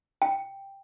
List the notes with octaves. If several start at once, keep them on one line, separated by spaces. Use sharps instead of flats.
G5